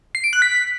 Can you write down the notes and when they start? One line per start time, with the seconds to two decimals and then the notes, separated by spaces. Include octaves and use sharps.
0.15 C7
0.24 D7
0.33 F#6
0.42 B6